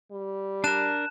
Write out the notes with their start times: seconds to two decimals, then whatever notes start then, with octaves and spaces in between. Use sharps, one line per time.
0.12 G3
0.64 D4 A#4 A5 F#6 E7